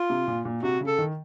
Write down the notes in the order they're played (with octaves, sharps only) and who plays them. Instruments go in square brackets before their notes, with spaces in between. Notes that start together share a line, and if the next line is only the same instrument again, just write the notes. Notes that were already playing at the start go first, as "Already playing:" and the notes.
Already playing: [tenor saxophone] F4
[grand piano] C3
A#2
A#2
[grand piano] C3 [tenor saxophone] F#4
[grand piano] C#3
[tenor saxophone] A4
[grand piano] D#3